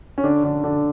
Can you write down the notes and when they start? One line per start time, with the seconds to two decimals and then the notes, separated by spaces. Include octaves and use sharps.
0.18 C#4
0.24 D3 D4
0.43 D3 D4
0.64 D3 D4